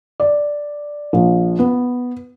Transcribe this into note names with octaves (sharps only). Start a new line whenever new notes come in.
D5
A#1
B3